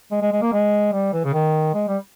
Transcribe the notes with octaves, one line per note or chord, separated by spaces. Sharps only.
G#3
G#3
G#3
A#3
G#3
G3
E3
C#3
D#3
G#3
G3